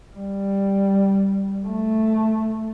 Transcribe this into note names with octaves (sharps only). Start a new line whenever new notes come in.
G3
A3